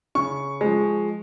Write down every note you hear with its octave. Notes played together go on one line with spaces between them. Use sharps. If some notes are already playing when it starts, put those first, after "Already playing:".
C#3 C#6
F3 G#3